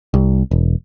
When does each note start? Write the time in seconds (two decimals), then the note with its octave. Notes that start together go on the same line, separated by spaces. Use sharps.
0.14 C2
0.51 E1